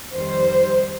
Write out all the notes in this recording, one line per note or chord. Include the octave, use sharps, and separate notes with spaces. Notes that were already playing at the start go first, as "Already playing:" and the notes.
F2 D#3 G3 C5